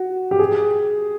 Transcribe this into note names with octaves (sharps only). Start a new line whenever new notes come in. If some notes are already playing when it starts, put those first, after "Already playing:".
Already playing: F#4
G4
G#4